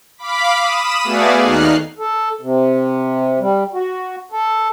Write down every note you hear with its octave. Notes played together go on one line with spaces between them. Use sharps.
F5 B5 D6 B6
B5 D#6 E7
A3 B3 F#4 G#4 D5 F5
D#2 D#4 F6 F#6 C7
A4
C3
G3
F#4
A4